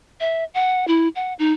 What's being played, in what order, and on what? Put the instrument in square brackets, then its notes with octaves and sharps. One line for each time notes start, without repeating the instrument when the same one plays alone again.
[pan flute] E5
F#5
E4
F#5
D#4